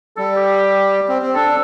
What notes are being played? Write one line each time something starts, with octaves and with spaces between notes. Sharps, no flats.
G3 A4
G4
C4
C4
D4 A4